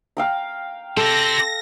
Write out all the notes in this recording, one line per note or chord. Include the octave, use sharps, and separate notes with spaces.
F5 G5 A#5
C4 G4 A4 A#6